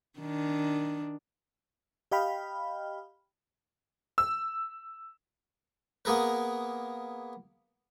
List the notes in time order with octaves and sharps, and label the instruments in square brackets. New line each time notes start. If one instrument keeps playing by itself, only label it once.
[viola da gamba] D#3 D4
[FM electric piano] G4 D#5 F5 G5 B5 F6
[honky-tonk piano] E6
[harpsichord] A#3 B3 G#4 A#4 B4